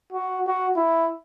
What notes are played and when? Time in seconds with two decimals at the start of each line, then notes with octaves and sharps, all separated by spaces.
0.12 F#4
0.47 F#4
0.77 E4